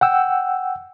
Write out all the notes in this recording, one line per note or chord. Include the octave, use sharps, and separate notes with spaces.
F#5 G5 E6